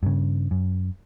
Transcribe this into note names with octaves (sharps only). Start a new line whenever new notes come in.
G2 C#3
F#2